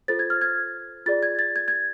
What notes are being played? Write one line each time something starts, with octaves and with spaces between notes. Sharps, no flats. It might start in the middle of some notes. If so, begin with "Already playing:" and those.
F4 A4 C5 A6
G#6
F6
G#6
F4 G#4 D5 A6
G#6
A6
G#6
G#6